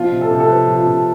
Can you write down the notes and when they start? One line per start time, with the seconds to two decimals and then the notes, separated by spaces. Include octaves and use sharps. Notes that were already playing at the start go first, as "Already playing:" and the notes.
Already playing: B2 F3 F4
0.11 C3
0.21 A4
0.31 C3
0.40 A4
0.48 F3 B4
0.68 F3
0.77 F4
0.87 C3